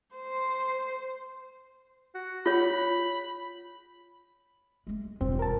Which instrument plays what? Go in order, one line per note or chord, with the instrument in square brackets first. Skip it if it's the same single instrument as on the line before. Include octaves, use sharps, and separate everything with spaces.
[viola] C5
[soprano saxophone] F#4
[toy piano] F4 C#5 [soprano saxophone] B5
[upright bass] G#3 A3
[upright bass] E1 F4 [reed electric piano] G2 C4
[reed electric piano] A#4 A5